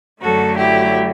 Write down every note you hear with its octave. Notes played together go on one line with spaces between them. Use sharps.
F#2 D3 F#3 A3 F#4 A4
E4 G4